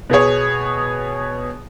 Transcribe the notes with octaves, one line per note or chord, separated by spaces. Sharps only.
B2 B3 G#4 C#5